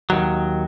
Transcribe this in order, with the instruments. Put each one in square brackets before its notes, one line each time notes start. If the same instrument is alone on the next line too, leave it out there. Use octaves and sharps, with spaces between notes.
[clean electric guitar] D#2 D#3 F#3